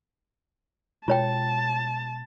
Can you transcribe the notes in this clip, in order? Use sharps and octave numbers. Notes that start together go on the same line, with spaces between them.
B2 G#3 F4 C#5 G5 A5